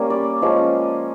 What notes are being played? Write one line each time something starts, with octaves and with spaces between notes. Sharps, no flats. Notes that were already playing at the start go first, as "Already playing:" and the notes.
Already playing: G3 A#3 C#4
D5
F3 G#3 C#4